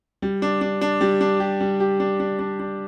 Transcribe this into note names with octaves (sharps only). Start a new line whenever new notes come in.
G3
D4
D4
D4
G3
D4
G4
G3
G4
D4
D4
D4
D4